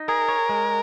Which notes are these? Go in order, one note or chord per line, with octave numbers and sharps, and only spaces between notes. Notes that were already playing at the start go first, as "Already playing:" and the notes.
Already playing: D#4
G#4 A#4
C#5
G#3